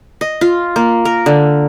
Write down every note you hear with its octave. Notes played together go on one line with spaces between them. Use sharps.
D#5
F4
A#3
A#4
D3